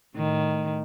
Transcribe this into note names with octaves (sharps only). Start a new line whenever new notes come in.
A2 D#3